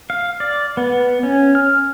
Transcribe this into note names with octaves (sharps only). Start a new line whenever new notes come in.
F5
D5
B3
C#4
F6